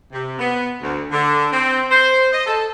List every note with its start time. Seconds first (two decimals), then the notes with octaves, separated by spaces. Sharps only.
0.12 C3
0.39 B3
0.82 D2
1.11 D3
1.52 C4
1.91 C5
2.32 D#5
2.46 A4